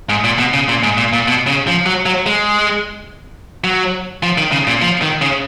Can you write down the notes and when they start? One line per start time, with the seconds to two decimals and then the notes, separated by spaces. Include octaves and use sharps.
0.09 G#2
0.24 A#2
0.39 B2
0.53 C#3
0.68 A#2
0.83 G#2
0.97 A#2
1.13 A#2
1.28 B2
1.47 C#3
1.67 F3
1.86 F#3
2.06 F#3
2.26 G#3
3.64 F#3
4.23 F3
4.38 D#3
4.52 C#3
4.67 A#2
4.82 F3
5.02 D#3
5.22 C#3